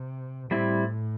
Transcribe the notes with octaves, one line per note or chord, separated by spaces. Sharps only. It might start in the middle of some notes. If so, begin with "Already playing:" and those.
Already playing: C3
A2 G3 C4 E4